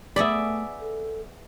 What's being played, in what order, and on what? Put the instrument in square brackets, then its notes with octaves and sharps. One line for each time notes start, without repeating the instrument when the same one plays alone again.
[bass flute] A3 [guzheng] B3 G#4 B5 [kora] D5 E5
[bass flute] A4